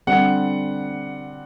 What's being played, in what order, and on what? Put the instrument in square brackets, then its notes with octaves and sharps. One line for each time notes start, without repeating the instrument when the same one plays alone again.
[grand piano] D3 G3 C4 F#5